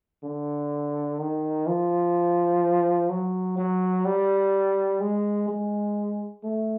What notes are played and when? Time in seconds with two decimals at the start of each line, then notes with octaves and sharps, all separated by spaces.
0.24 D3
1.19 D#3
1.67 F3
3.10 F#3
3.57 F#3
4.05 G3
5.00 G#3
5.48 G#3
6.44 A3